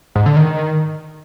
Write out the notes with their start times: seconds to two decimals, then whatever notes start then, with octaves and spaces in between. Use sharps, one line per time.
0.15 G#2
0.26 D3
0.37 D#3